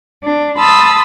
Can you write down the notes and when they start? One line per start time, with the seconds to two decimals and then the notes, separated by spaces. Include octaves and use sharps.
0.22 D4
0.57 A5 B5 C6 D#6 E6 A6